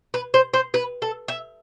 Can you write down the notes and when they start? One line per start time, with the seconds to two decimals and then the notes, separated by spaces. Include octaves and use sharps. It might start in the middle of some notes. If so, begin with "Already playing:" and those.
0.14 B4
0.34 C5
0.54 C5
0.74 B4
1.02 A4
1.28 E5